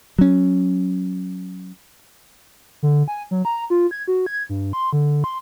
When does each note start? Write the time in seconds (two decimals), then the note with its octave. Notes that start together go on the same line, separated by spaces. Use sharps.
0.19 F#3 C#4
2.83 D3
3.08 G#5
3.31 F#3
3.45 A#5
3.70 F4
3.91 G#6
4.08 F#4
4.26 G#6
4.49 G2
4.73 C6
4.93 D3
5.24 C6